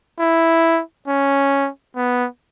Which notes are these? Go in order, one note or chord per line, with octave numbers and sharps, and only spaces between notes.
E4
C#4
B3